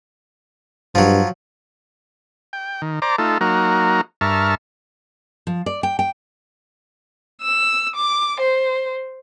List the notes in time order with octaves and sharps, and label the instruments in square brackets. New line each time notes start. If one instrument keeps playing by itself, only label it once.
[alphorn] G2 [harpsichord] F3 F#3
[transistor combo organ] G5
D#3
C5 D5 A#5 D6
A3 D#4 F4 A4
F#3 A#3 D#4 F#4 A#4
G2 A#4 E5 A5 C#6 F6
[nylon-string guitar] F3
D5
G5
G5
[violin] E6
D6
C5